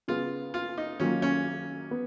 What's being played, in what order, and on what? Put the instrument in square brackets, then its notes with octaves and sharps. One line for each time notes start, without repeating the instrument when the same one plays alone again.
[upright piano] C#3 G#3 B3 [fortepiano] F4
[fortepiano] F4
D#4
[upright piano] D#3 F#3 A#3 F4 [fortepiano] C#4
[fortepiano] C#4
[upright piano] B3